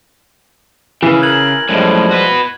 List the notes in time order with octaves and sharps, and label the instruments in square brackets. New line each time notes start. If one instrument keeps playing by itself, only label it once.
[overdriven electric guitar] C#3 [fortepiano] E3
[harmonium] A#4 [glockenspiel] F#6 G#6 F#7
[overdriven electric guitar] F#2 A2 [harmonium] F3 G3 G#3
[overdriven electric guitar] F#4 B4